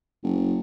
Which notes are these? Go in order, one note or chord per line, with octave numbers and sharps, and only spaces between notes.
F#1